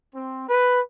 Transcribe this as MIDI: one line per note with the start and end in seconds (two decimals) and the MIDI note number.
0.15 0.46 60
0.49 0.80 71